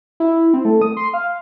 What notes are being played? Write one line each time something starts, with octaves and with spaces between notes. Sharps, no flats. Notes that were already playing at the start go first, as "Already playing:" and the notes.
E4
C4
A3
D#6
C6
F5